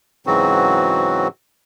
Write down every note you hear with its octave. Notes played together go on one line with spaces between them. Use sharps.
G#2 C#3 E3 F#3 C4 F#4